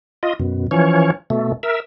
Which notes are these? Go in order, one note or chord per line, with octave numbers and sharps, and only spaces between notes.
F4 D#5
F#2 B2
E3 F3 C#4 C#5
B2 A3
A#4 E5